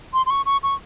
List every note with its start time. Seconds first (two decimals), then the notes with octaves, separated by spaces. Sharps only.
0.13 C6
0.26 C6
0.30 C#6
0.46 C#6
0.63 C#6